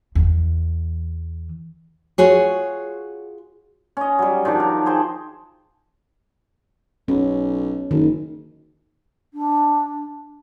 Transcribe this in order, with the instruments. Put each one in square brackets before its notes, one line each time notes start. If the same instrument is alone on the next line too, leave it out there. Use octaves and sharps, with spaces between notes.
[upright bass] E2 E3
[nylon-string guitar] F4 F#4 G#4 C#5
[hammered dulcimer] C#4 D#5
F#3 G3
D#3 F3 F#3 D4
A#4
G#4 C5 G5 A5
[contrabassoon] B1 [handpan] C#4
[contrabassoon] F#1 [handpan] D#3
[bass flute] D4